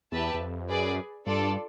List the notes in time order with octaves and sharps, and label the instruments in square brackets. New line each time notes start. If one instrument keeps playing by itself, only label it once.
[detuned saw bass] E2 [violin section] G4 B4 E5 A5
[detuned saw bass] E2
F2
[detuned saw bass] F#2 [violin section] G#4 B4 D5
[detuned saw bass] G2 [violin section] D4 F4 A4 D5